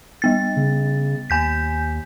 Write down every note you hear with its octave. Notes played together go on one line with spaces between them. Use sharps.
G3 B3 A6
C#3
D#2 G#5 G6 B6